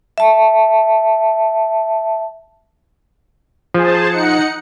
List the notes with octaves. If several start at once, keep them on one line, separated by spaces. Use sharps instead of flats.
E5 A5
F3 G#4 C5 A5
D#4 F#5 C#7